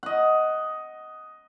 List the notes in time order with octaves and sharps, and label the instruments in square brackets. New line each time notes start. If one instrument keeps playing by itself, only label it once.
[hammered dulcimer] D#5 F#5